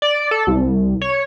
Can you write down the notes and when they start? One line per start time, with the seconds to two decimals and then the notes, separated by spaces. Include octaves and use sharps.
0.02 D5
0.31 A4
0.47 C2
1.01 C#5